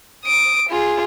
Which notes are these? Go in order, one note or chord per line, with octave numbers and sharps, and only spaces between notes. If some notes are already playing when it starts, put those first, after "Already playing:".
D#6 D7
F4 G#4